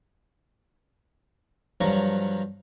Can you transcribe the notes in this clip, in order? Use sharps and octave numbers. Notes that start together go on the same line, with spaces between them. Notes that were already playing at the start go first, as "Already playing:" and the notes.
G2 F3 F#3 A#5 C#6